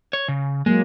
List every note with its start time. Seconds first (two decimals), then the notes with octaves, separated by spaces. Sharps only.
0.13 C#5
0.28 C#3
0.66 F#3 G#3 A#3